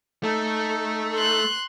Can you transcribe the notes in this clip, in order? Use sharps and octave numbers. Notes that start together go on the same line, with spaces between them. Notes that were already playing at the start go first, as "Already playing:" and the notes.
A3 D#4 A4
C6 F#6